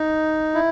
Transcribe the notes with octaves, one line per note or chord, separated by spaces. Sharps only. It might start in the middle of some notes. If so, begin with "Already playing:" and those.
Already playing: D#4
E4